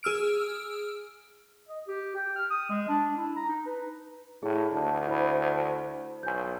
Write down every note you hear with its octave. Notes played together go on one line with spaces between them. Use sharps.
G#4 E6 F6 D7
D#5
G4
G5
F6
D#6
G#3
D4
E4
A#5
D#4
B4
A2 E4 G#4
D2 A5
E4 C5 B5
B1 G#5 G6